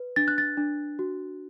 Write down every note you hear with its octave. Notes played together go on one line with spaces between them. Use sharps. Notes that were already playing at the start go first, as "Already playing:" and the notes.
Already playing: B4
D4 A6
F#6
A6
D4
F#4